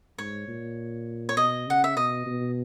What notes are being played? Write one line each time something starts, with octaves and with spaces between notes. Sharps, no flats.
G#2 C#5
A#2
C#5
B2 D#5
C#3 F#5
E5
B2 D#5
B2